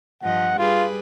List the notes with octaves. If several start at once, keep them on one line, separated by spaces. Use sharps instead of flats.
G2 F3 D#5 F#5
G3 F4 G#4 B4